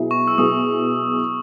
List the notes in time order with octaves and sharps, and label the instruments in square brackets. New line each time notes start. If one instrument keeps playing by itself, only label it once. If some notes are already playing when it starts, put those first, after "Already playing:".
Already playing: [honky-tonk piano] B2 F#3 B3 E4 G#4
[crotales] C#6
E6
[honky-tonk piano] B2 F#3 B3 E4 G#4 [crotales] D#6